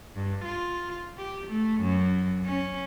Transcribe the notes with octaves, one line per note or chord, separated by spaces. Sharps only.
G2
F4
G4
A3
F#2
C#4